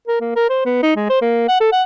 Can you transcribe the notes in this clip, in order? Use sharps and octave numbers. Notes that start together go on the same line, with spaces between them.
A#4
A#3
A#4
C5
B3
D#4
G#3
C5
A#3
F#5
A4
F#5